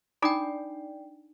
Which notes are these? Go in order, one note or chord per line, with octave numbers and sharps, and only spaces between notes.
D4 D#4 D5 G5 G#5 B5 D6 D#6